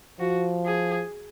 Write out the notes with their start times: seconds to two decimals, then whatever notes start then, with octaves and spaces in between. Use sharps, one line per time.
0.19 F3 F#4
0.66 G#4